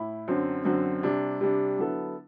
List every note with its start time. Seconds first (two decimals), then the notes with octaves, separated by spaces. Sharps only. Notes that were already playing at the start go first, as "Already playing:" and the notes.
Already playing: A2 E4
0.28 F#2 D3 F#3 C4
0.65 F#2 D3 F#3 C4
1.03 C3 G3 D4
1.41 C3 G3 D4
1.77 D3 F#3 B3 E4 A4